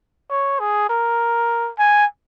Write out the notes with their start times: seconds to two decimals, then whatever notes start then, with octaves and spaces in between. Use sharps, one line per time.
0.30 C#5
0.59 G#4
0.89 A#4
1.78 G#5